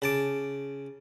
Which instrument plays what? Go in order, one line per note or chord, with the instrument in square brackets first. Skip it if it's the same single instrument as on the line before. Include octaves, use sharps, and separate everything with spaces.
[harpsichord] C#3 A5 D6